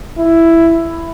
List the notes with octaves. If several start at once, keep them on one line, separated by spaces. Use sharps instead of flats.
E4